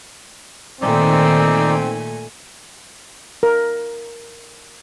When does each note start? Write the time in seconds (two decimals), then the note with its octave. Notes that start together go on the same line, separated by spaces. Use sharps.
0.82 A#2 D#3 A3 C4 D#4 D5 G#5
3.43 A#4